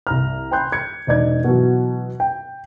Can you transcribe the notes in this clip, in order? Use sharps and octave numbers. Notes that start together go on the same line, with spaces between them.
C2 A#5 F6
G5 G#5 B5 C6 F#6 G6
G#6 C#7
E1 D#4 D5 G#6
B2 E3 F#3
G5